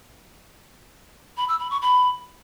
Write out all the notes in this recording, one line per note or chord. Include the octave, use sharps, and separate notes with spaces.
B5
E6
B5
C#6
B5